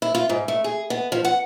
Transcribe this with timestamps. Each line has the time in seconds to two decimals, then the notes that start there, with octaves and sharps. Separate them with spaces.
0.02 E4
0.15 F4
0.29 G#2
0.48 A3
0.64 G#4
0.90 B3
1.12 F3
1.25 F#5